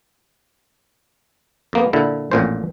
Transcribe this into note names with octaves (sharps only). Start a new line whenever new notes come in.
F2 A#3 B3
A#2 D3 E4
A1 F2 A#2 C#4 C5